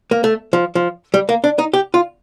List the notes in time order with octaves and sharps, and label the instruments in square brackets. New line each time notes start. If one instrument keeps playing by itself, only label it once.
[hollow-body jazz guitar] A#3
A3
F3
F3
G3
A#3
D4
D#4
G4
F4